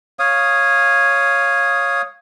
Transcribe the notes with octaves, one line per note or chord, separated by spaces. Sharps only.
C#5 F5 D#6